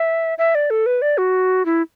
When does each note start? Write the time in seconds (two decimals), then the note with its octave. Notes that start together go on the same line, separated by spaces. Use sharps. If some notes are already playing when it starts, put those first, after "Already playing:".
Already playing: E5
0.38 E5
0.55 D5
0.70 A4
0.86 B4
1.02 D5
1.18 F#4
1.66 E4